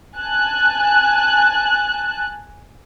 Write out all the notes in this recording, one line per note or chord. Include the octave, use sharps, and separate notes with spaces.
G#5 A5 F#6